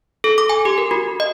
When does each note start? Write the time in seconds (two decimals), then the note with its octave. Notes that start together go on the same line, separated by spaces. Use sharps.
0.24 A4
0.38 D6
0.49 G#5
0.65 G4
0.78 A#4
0.91 F#4
1.20 D#5